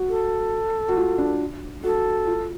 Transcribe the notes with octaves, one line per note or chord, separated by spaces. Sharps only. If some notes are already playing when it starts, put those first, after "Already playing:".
Already playing: F#4
A4
F#4
F4
D4
F#4 A4
F4